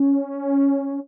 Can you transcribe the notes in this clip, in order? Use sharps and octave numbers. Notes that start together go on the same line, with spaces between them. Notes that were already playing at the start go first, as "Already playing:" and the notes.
Already playing: C#4